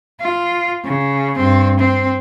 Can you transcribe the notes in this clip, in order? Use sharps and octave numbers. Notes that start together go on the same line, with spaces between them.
F4
C#3
G2 C4
C4